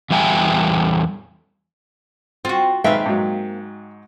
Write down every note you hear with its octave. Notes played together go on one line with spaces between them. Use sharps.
E2 G3 E5 G5 G#5
C4 F4 F#4
G#1 A#3 C4 B4 E5 F5 G5
G#2 F#3